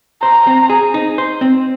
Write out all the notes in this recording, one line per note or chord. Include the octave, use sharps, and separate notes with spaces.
C5 A#5
C4
G#4
D#4
C5
C4